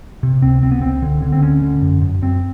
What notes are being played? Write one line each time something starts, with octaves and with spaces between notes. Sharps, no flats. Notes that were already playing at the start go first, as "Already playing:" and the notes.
C3
C#2 C4
C#2 C4
B3
C#2 C4
D3
D3
C4
D2 C#4
D3
F#2
F#2
F#2 C4